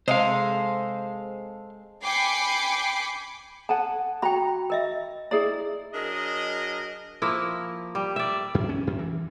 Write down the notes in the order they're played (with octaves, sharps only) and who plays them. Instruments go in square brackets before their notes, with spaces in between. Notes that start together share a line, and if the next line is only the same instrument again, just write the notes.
[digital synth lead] C3 [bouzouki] G#3 A4 [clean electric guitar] C5 F5 [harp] D#5 C6
[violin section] G5 G#5 B5 D6 C7 C#7
[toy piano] A4 [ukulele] F#5 G#5 A5
[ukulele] F#4 A#5 [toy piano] G5 B5
[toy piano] A#4 D#5 E5
[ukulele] E4 G#4 D5 [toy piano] A#5
[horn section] F#3 D4 G#4 A#4 D#5
[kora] F3 A#3 E4
G3
D5 E5
[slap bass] F#2
C#4
F#2
E3